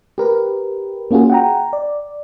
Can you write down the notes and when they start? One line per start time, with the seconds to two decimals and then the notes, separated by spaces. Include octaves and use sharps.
0.18 G4 A#4 B4
1.11 A#3 C#4 F4 F#4 G#4
1.30 F#5 G5 A#5
1.73 D5